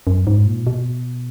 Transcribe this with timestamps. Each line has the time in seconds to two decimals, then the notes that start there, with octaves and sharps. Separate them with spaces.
0.07 F#2
0.27 G#2
0.47 A#2
0.67 B2